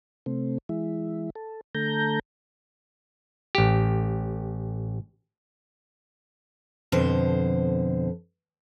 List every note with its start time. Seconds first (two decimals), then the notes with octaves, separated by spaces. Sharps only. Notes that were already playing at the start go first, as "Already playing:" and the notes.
0.26 C3 A3 C4
0.69 E3 G#3 E4
1.35 A4
1.75 D3 A3 A4 A#5 G6
3.55 A1 G4
6.92 F2 B2 D3 C5